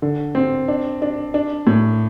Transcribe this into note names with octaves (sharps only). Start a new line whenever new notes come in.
D3
C4
D4
D4
D4
A2